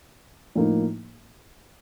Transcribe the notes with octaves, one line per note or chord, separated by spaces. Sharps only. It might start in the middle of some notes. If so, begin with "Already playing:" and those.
A2 F3 A#3 D#4